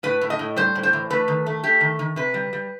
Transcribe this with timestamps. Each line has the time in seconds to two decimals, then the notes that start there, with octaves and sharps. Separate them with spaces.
0.03 A2 B4
0.21 A2
0.30 D#5
0.39 A2
0.56 G3 C5
0.75 A2
0.83 C5
0.93 E3
1.10 A3 B4
1.28 D#3
1.46 A3
1.64 A3 G4
1.81 D#3
1.99 D#3
2.16 C3 B4
2.34 G3
2.53 G3